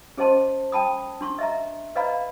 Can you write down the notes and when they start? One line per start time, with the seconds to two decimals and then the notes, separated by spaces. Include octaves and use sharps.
0.17 C#4 G#4 C5 D#5 A5 C6
0.72 G5 A5 B5 D#6
1.21 D4 C6 C#6
1.39 D#5 E5 A#5
1.95 B4 D5 D#5 F5 A#5 B5